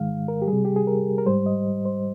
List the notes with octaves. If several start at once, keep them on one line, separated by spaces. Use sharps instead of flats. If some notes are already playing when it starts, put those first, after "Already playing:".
Already playing: G#2 D#3 G#3 F5
A#4
G4
C3 G3 G#4
G4
G#4
A#4
A#4
G#2 G3 C5
D#5
C5